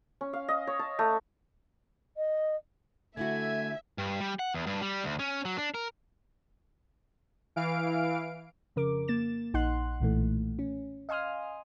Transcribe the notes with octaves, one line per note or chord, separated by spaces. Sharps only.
C#4
F5
D#5
C#5
A5
A3
D#5
D3 A3 E4 F#4 E5 G#5
G2
G3
F#5
E2
G2
G3
D2
C#4
F#3
D4
A#4
E3 F5 D7
F2 C#3 A#4 D6
A#3 A6 E7
A#1 D#4 F#5 C6 F#6
B1 A#2 E3 A3
C#4
D#5 F5 G#5 C6 D#6 F6